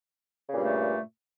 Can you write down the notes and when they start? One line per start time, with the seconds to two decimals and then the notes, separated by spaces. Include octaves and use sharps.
0.49 C#3
0.53 A#2
0.57 G2
0.61 A3